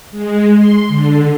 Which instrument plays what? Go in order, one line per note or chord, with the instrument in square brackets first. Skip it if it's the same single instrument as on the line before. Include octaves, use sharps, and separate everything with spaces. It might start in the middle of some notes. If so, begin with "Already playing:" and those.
[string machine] G#3
C6
D3